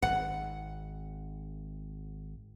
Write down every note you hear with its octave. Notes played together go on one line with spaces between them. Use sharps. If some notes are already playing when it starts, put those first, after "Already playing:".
G#1 F#5